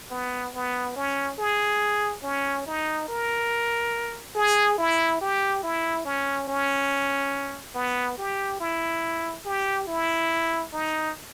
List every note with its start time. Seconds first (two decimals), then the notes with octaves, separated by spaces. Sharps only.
0.11 B3
0.54 B3
0.96 C#4
1.39 G#4
2.24 C#4
2.66 D#4
3.08 A#4
4.35 G#4
4.78 E4
5.21 G4
5.63 E4
6.05 C#4
6.48 C#4
7.75 B3
8.18 G4
8.60 E4
9.45 G4
9.87 E4
10.73 D#4